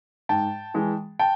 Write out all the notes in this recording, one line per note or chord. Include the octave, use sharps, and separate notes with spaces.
G#2 G5 A5
E3 G#3
G5 A5